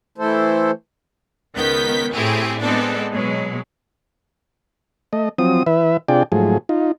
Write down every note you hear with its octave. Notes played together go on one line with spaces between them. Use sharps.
E3 A3 E4 A4 C5
C#2 D#3 B3 G6 B6
A2 A3 C4 E4 G4 G#4
G#3 B3 C4 D4 A4 D5
B2 F#3 G#3
A3 D#5
F3 F#3 C4 D#6
E3 B4 E5
C3 D4 F4 G#4 D5 G5
G#2 F3 F#3 A3 G#4
D#4 F4